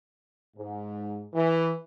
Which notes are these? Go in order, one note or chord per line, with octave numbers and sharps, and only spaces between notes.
G#2
E3